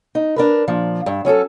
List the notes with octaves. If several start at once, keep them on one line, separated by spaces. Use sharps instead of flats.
D#4
D4 A#4 B4
A#2 F3 D5
G2
F#3 C#4 G#4 A4